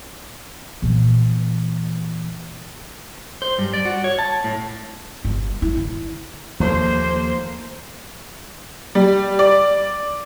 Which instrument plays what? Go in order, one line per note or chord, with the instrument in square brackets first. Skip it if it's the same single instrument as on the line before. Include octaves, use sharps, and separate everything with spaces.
[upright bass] A#2 E3
[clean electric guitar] C5
G2
D5
F#4
C#5
A5
A2
[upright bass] G1
E4
D#3
[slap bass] D#2 F3 A3 [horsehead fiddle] A#3 C5
[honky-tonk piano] G3
D5